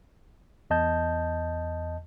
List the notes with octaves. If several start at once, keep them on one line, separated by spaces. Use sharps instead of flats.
E2 D#5 A5 G6